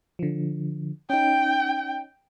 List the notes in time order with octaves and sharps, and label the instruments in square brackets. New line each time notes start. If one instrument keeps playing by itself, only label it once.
[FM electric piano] D3 F3
[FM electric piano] C#4 D#4 [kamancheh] G5